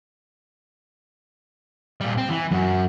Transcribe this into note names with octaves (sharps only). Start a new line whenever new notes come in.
A#2 G3
C4
E3
F#2 F#4